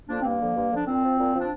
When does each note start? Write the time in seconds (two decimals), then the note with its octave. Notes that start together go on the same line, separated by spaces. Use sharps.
0.08 D3 F3 A#3 D4
0.20 C4
0.23 G2 A#3
0.40 D3 F3
0.55 G2
0.71 D3 F3
0.77 D4
0.87 A#2 C4
1.03 F3
1.18 A#2
1.35 F3
1.40 D4